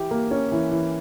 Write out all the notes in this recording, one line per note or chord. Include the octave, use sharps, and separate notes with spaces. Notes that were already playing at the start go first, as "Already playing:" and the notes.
Already playing: E3 G4
A#3
C#4
E3
E3